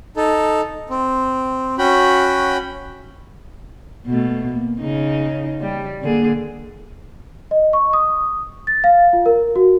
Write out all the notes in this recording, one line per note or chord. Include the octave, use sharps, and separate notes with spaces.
D#4 A4
C4
C#4 F#4 G5 B5
B2 A3
A#3
C#3 D#4
G3
D3 A#3 G#4
D#5
C#6
D#6
A6
F5
F4
A#4
F#4